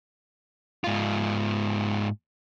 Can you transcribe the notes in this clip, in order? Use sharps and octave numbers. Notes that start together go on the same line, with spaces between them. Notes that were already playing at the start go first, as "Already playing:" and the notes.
G#2 F4